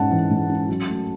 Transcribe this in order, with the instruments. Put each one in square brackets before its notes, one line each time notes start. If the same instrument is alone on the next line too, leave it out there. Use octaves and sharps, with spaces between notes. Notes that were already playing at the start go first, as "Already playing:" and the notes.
Already playing: [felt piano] G#2 G#3 C#4 F#5 A5
E3
G#3
C#4
F#3
A3